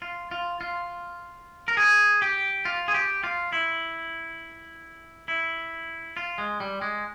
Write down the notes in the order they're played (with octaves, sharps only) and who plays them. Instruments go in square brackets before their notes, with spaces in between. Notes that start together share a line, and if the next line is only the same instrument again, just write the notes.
[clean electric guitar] F4
F4
F4
A#4
G#4
G4
F4
G#4
G4
F4
E4
E4
F4
G#3
G3
G#3